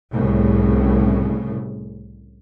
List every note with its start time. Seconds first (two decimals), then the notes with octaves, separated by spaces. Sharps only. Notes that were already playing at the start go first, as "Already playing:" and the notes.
0.12 C2 A2 C#3